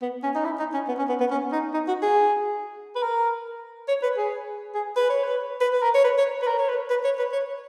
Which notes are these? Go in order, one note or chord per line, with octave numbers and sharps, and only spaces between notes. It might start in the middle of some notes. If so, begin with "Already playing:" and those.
B3
C#4
D#4
E4
D#4
C#4
B3
C#4
B3
B3
C#4
D#4
D#4
F#4
G#4
B4
A#4
C#5
B4
G#4
G#4
B4
C#5
B4
B4
B4
A#4
C#5
B4
C#5
B4
A#4
C#5
B4
B4
C#5
B4
C#5